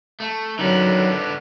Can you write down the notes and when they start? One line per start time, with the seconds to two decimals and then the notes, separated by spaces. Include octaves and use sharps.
0.20 A3
0.59 D3 D#3 F#3 B3 C#4